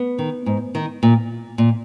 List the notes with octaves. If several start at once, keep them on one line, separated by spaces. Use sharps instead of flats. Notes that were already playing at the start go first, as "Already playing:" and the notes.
Already playing: B3
D#3
G#2
D#3
A#2
A#2